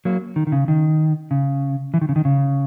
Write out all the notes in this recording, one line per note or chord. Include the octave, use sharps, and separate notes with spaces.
F#3 A#3
D#3
D#3
C#3
D#3
C#3
E3
D#3
C#3
D#3
C#3